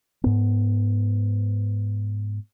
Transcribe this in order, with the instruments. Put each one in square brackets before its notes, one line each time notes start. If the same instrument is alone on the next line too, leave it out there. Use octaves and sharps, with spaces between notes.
[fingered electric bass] G#2 B3